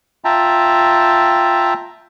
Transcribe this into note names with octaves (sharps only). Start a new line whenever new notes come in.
F4 E5 G5 A5 A#5